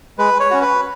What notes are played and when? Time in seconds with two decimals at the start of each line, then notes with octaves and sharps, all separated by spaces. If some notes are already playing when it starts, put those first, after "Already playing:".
0.18 G#3 B4
0.40 C#5
0.51 C#4 F#4
0.61 B4